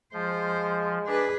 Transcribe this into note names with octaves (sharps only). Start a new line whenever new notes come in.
F3 G#3 C5
D4 G#4 B4